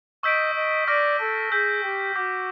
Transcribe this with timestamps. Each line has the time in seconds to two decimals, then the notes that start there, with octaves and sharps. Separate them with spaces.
0.23 D#5 C#6 E6 G6 B6 D7
0.55 D#5
0.87 D5 C#6 F6 A#6 D7
1.20 A4
1.52 G#4 E6 G6 B6
1.83 G4
2.16 F#4 D6 G6 B6